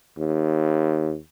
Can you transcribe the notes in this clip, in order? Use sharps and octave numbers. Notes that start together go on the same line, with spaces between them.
D#2